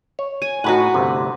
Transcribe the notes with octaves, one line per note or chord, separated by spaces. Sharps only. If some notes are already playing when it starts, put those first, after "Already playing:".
C#5
G#5
A2 D#4 F#4 B4 F#5
G1 D2 C3